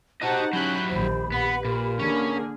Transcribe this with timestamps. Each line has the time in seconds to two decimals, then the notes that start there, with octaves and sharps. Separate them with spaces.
0.22 D#4 F#4 G4 C5 D#5 F#5 A5
0.53 F#3 C#4 E4 G4 B5 F#6 G6
0.89 A#1 D#2 C5
1.32 B3 B4 F#5
1.65 A#2 A#4
1.99 D3 A#3 C#4 G#4